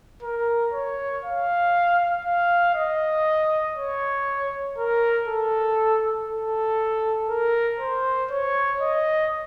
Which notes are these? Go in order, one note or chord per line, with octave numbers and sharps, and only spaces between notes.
A#4
C#5
F5
F5
D#5
C#5
A#4
A4
A4
A#4
C5
C#5
D#5